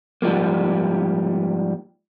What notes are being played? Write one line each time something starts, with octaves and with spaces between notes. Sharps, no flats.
G#2 F3 G3 G#3 A#3